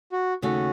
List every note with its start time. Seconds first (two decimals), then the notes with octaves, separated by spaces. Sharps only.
0.12 F#4
0.42 D#2 C#3 A3 C#4 F#4